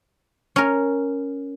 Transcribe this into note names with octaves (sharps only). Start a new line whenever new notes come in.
C#4 A#4